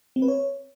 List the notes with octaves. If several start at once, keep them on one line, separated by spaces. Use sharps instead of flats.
C4
B4
C#5